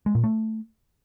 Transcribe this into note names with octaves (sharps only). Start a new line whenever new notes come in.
G#3
A#2
A3